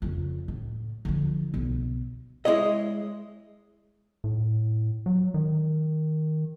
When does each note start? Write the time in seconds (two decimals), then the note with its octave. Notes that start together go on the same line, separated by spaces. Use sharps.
0.02 F2 C#3
0.48 A2
1.05 D3 F3
1.54 B1
2.45 G#3 E4 C#5 D#5
4.24 A2
5.06 F#3
5.34 D#3